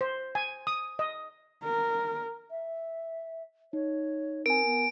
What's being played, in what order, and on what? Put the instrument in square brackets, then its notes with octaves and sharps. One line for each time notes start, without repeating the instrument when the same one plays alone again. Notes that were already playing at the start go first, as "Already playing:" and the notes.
[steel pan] C5
G#5
D#6
D#5
[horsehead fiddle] A#4
[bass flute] E5
[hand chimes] D#4 [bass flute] C#5
[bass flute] C4 [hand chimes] A#4 G#5 [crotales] D7
[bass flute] B3